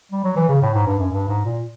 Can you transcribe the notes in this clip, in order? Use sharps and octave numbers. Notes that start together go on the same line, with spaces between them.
G3
F#3
E3
C#3
A2
G#2
G2
F#2
G2
G#2
A#2